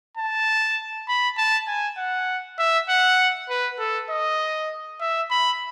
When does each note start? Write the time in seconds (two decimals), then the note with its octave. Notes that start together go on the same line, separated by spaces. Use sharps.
0.17 A5
1.08 B5
1.37 A5
1.67 G#5
1.97 F#5
2.59 E5
2.89 F#5
3.49 B4
3.79 A4
4.10 D#5
5.01 E5
5.30 B5